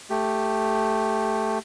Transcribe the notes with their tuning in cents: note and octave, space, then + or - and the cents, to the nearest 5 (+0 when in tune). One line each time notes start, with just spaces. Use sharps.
A3 +0 G4 +0